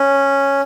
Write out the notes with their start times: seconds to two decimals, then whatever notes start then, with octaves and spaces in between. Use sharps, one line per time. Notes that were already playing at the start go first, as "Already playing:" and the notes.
Already playing: C#4